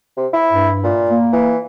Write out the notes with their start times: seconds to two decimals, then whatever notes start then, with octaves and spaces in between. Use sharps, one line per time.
0.17 C3
0.33 E4
0.53 G2
0.84 A#2
1.10 A#3
1.33 E3